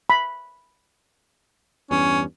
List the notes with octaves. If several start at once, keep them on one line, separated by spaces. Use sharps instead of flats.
B5
E2 G2 C#4